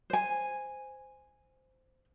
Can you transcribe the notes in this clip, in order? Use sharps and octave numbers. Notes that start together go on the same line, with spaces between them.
C5 G#5